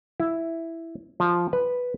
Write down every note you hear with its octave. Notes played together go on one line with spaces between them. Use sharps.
E4
F3
B4